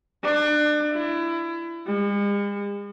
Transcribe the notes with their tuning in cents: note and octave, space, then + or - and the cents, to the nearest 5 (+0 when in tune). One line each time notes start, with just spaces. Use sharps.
D4 +30
E4 +25
G#3 -45